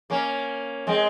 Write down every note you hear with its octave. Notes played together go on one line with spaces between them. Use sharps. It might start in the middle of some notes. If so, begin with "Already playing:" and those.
A#3 C#4
G#3 C4